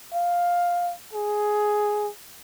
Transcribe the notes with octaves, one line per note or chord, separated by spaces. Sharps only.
F5
G#4